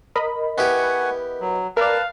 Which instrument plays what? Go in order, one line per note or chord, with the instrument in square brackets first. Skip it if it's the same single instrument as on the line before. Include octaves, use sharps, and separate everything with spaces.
[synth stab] A#4 D#5 B5
[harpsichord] B3 E4 G4 [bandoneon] F#5 G#5 C#6
[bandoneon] F#3
[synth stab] A#4 D5 [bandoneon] B4 A5 [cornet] F5